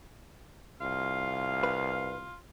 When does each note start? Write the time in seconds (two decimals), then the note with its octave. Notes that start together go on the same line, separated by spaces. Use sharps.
0.81 C2 F4 F5
1.63 B4